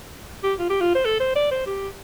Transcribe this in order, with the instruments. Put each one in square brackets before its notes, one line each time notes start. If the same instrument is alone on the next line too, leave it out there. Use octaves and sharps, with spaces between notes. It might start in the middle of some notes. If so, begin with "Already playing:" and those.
[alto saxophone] G4
F4
G4
F4
C5
A4
C5
D5
C5
G4